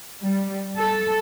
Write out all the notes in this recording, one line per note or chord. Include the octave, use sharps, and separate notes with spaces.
G3
A4